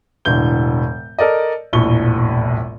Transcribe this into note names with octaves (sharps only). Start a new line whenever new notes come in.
E1 A2 D3 E3 G6 G7
A4 A#4 D5 D#5
E1 A#1 A2 C#6 G7